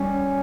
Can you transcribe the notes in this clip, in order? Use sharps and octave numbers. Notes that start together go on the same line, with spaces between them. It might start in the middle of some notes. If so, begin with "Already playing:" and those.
Already playing: G3 C#4